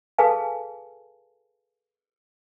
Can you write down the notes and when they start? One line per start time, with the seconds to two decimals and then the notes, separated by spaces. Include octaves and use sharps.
0.18 G#4 A4 B4 F5 G#5 A5